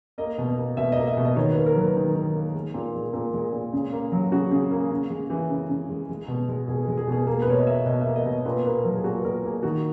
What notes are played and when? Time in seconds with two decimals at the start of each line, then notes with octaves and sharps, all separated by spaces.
0.18 A#3 D#5
0.38 B2
0.48 D#5
0.58 A#3
0.77 B2 E5
0.92 A#3 D#5
1.07 E5
1.17 B2
1.25 D#5
1.36 D#3 C#5
1.52 A#3 B4
1.66 A#4
1.75 F#3
1.81 B4
1.96 D#3
2.15 D#3
2.36 A#3
2.54 G#3
2.74 A#2
2.95 G#3
3.13 A#2 A#4
3.33 G#3
3.53 A#2
3.73 C#3
3.92 A#3
4.12 F#3
4.32 C#3 F#4
4.52 C#3
4.71 A#3
4.91 C#3
5.10 G#3
5.30 E3
5.49 C#3
5.69 C#3
5.89 G#3
6.09 G#3
6.28 B2
6.48 G#3
6.68 B2 G#4
6.83 G#3 G#4
6.97 G#4
7.07 B2 G#4
7.27 A#3 G#4
7.42 B4
7.47 B2 C#5
7.58 D#5
7.67 A#3 E5
7.86 B2 D#5
8.01 A#3 E5
8.16 D#5
8.25 B2
8.46 A#2 B4
8.65 A#3 B4
8.84 F#3 A#4
8.96 G#4
9.04 A#2 F#4
9.19 B4
9.24 A#2 A#4
9.43 A#3 G#4
9.63 D#3 F#4